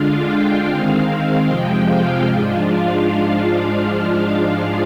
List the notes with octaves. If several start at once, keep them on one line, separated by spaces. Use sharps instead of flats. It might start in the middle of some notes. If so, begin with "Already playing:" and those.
Already playing: D3 G#3 D4 F4 F5
G5
D#3 G#3 C4 F5
F2 C3 F3 G#3 G5
F5
G#2 F3 G#3 D4 F4
F5